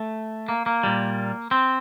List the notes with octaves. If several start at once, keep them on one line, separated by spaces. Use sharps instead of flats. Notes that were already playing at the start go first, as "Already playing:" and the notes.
Already playing: A3
A#3
A#3
A#2 G3
C4